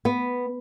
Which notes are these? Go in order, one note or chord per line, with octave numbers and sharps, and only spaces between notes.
B3